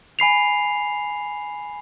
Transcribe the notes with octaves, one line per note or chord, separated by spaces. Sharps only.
G#5 B5 C7 F7